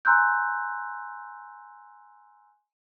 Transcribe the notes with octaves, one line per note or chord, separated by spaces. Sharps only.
G#5 A#5 C6 E6 F#6 G6